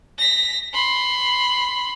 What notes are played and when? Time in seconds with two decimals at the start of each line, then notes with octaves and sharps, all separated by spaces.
0.18 A#6 B6
0.74 B5 C6